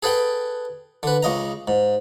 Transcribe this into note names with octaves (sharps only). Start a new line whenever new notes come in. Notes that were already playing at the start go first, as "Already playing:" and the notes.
G#4 A4 B4 F#5 G5
D3 B4
C#2 C#3 D#5 A#5
G#2